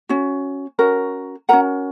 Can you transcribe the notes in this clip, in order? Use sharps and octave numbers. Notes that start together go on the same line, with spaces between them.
C#4 F#4
C#4 F#4 A#4
C#4 F#4 A#4 F#5 A#5